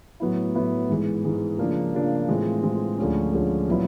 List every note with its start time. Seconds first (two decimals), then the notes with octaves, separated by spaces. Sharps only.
0.20 A2 F#3 B3 E4
0.55 A2 F#3 B3 E4
0.89 G#2 E3 G#3
1.25 G#2 E3 G#3
1.59 C#3 F3 A#3 D4
1.94 C#3 F3 A#3 D4
2.29 A2 E3 G#3 C4 F4
2.63 A2 E3 G#3 C4 F4
2.98 D2 D3 F3 G#3 C#4
3.33 D2 D3 F3 G#3 C#4
3.68 A#2 F#3 B3 E4